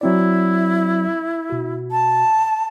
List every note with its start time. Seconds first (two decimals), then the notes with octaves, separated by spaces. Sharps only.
0.01 F#3 C4 E4 D5
1.50 B2 F#4
1.91 A5